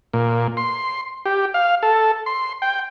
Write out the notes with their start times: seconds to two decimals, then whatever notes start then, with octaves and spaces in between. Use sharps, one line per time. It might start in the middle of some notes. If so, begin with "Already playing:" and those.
0.13 A#2
0.57 C6
1.26 G4
1.54 F5
1.83 A4
2.26 C6
2.62 G5